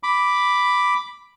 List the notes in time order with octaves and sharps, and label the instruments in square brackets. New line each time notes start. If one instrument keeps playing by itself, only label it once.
[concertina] B5 D6